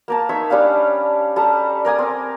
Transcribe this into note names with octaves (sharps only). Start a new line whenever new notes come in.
A#3 A#4 A5
D#4 C#5 E5 B5
G3 C#4 D4 F5
G3 A4 A5 A#5
A#4 D5 G#5 D#6
C4 D6